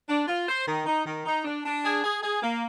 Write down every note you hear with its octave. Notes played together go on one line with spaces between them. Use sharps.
D4
F4
C5
D#3
D#4
D#3
D#4
D4
D4
G#4
G#4
G#4
A#3